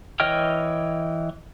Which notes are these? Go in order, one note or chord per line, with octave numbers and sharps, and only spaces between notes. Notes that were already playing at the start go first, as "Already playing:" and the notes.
E3 C#5 D#5 G5 F6